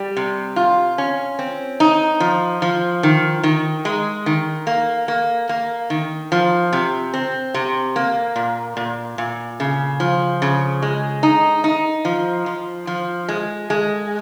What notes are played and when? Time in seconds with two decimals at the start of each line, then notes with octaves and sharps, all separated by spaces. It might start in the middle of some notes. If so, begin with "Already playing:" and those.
Already playing: G3
0.17 C3
0.56 F4
0.98 C#4
1.39 C4
1.80 D#4
2.20 F3
2.62 F3
3.03 D#3
3.43 D#3
3.85 G#3
4.26 D#3
4.67 A#3
5.08 A#3
5.49 A#3
5.90 D#3
6.32 F3
6.73 C3
7.14 C4
7.54 C3
7.96 A#3
8.36 A#2
8.77 A#2
9.18 A#2
9.60 C#3
10.00 F3
10.42 C#3
10.82 G#3
11.23 D#4
11.64 D#4
12.05 F3
12.46 F3
12.87 F3
13.29 G#3
13.70 G#3